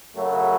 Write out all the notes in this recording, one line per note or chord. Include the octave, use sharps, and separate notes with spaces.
F#2 C#3 F#3 A3